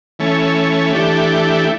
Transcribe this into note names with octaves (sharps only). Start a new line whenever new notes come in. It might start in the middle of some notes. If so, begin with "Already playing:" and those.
E3 A3 C#4
E3 A3 D4 G4